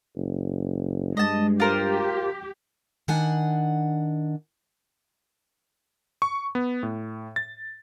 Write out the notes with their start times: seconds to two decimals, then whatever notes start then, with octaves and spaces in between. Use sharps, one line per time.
0.16 F#1
1.17 G2 G#3 D#5 A5
1.60 F4 G4 A#4 C5
3.08 D#3 D4 F#5 G#5
6.22 C#6
6.55 B3
6.83 A2
7.36 A6